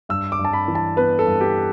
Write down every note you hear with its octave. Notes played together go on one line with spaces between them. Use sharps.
G2 E6
D6
G2
A5
B5
E3
A5
B3 B4
A4
G2
G4